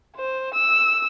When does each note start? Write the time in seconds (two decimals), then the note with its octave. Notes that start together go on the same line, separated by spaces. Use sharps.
0.16 C5
0.54 E6